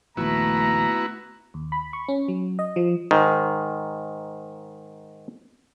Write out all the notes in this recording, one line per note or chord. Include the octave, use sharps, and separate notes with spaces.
A#1 D#2 A3 B3 E4 F#4 A#5
D#2
B5
C#6
C#4
F#3
D#5
F3
G#2 D#3